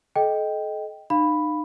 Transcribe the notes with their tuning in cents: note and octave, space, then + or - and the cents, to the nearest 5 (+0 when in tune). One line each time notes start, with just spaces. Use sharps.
A4 -40 D#5 +0 G5 +0
D#4 -40 F5 +0 B5 +0